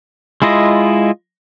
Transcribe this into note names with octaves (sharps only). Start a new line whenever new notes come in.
G#3 E4 F4 D#5